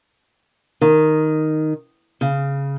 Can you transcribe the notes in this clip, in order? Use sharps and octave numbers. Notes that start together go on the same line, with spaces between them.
D#3
C#3